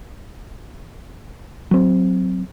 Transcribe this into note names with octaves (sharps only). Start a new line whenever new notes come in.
F#3 C4